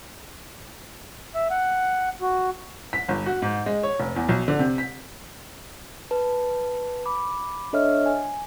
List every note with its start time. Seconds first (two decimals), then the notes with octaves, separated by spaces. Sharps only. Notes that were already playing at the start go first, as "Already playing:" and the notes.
1.35 E5
1.51 F#5
2.22 F#4
2.93 B6
3.08 G1
3.26 F#4
3.42 G#2
3.66 G#3
3.83 C#5
4.00 F1
4.16 E2
4.29 B1
4.48 D3
4.59 C3
4.78 B6
6.11 B4 A5
7.06 B5 D6
7.73 D4 A4 C#5 D#5 E5 F6
8.06 G#5